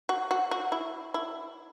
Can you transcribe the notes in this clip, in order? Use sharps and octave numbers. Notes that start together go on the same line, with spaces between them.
F#4
F#4
F#4
E4
E4